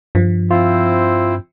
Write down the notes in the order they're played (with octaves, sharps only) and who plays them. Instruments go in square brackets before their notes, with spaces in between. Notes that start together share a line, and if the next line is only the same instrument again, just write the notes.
[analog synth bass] G2 [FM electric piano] F3
[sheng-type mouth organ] C4 E4 C5 [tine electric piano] F4